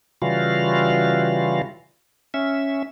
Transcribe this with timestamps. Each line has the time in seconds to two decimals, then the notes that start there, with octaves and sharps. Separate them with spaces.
0.22 C#3 E3 G3 F4 F#4 F5
2.34 C#4 E5